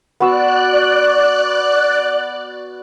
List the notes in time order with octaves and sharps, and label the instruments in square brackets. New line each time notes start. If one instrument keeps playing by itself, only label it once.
[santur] B3 F#4 E6 [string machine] D5 F#6